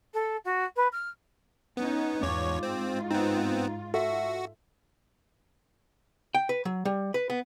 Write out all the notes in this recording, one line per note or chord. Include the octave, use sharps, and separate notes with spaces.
A4
F#4
B4
F6
B3 C#4 D#4
E2 G#2 F4 C#5 D6
C4
B3 C4 D#4
F#4 A4 E5
G5
B4
F#3
G3
B4
B3